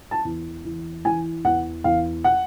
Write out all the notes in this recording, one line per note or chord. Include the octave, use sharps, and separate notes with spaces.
A5
E2
E3
E3 G#5
E2 F#5
E2 F5
F#5